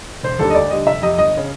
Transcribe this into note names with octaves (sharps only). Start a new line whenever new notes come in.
E1 C5
D#2 D3 G3 A4
D#5
D2 D5
D3 G3 D#5
F1 E5
F2 C3 D#5
G1 D#5
C#3